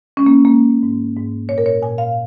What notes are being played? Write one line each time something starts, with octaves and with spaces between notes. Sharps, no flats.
G#3 C#4
A#3
G#3 A#3
G#2
G#2
A#2 C#5
A#4
C#5
A#2 G#5
F5